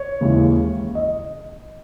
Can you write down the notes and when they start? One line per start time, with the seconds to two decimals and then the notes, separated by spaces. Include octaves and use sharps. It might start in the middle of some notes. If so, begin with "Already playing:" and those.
Already playing: C#5
0.21 D#2 C#3 E3 G#3
0.95 D#5